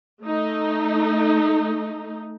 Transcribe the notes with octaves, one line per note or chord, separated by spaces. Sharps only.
A3 D#4